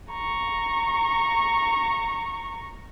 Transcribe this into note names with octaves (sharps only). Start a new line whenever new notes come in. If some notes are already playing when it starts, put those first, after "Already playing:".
A#5 C#6